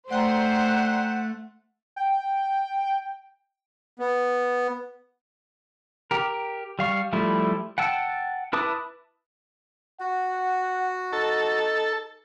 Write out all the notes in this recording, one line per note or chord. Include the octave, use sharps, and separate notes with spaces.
A3 C5 D5 F#5 G5 A#5
G5
B3
G4 A#4
G3 F5 C#6
F3 G3 A3 E4
F#5 G5 A5 E6
E4 B4 A5 D6 D#6
F#4 F#5
D#4 A4